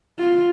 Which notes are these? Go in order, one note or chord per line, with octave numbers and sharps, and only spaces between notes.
F4